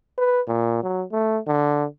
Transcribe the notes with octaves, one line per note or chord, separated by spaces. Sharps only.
B4
A#2
F#3
A3
D3